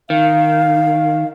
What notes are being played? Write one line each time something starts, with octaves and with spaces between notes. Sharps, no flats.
D#3 F5